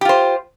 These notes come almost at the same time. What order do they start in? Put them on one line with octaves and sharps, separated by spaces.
G4 F4 C5